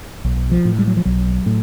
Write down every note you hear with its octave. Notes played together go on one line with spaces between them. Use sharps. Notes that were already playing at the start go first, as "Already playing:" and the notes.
B1
F3
A2
G3
F#3
F3
B1 F#3
A2